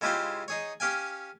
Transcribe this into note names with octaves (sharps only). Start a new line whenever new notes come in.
C#3 G#3 E4 F4 G4 C5
D#4 G#4 C#5
C#4 G4 F5 G5 G#5